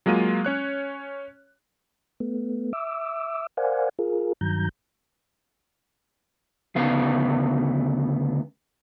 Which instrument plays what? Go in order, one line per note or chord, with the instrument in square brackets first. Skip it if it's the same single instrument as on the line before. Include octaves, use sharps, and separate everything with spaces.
[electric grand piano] F#3 G#3 A#3 F4 D#7
C#4 C#5 F#6
[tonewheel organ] A3 B3
E5 D6 E6
A#4 C5 D5 F5 F#5 G#5
F4 G#4 A#4
G2 D#3 F#3 A#5 G6
[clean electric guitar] D2 C#3 B3 F5